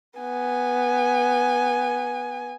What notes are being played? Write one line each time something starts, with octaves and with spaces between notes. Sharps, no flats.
B3 G#5